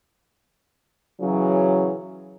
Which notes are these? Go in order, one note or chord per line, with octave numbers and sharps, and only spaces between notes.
C#3 E3 F#3